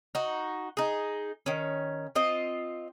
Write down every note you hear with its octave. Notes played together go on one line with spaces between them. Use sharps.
D#4 F#4
D#4 G#4
D#3 C#4
C4 F4 D#5